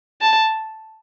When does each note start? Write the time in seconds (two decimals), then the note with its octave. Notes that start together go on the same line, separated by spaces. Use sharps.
0.21 A5